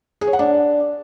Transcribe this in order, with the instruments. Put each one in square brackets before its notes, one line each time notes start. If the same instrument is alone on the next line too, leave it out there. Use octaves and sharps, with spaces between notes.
[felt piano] G#4
C#5
F#5
D4